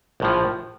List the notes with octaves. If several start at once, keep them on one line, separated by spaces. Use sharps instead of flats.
A#1 A2 F3